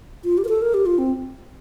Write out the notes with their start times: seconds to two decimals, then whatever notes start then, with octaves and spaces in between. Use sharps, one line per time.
0.24 F4
0.38 G4
0.45 A#4
0.49 A4
0.62 A#4
0.74 G4
0.86 F4
0.98 C4